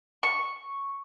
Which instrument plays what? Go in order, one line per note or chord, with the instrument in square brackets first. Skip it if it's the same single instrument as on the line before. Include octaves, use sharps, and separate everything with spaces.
[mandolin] C#6